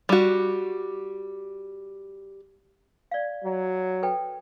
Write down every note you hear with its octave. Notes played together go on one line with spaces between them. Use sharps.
G3 F#4
D5 F5
F#3
A4 B4 G5